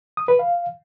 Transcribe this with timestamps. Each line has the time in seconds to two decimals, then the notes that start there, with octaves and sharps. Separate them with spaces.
0.17 D#6
0.28 B4
0.39 F5